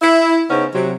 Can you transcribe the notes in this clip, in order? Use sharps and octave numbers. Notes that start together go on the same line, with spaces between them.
E4
C#3 B3 C#4 D#4 C5
C3 F#3